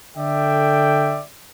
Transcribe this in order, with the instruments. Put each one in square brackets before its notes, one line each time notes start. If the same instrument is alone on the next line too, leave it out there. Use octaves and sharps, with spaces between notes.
[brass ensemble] D3 A4 D5 E5 G5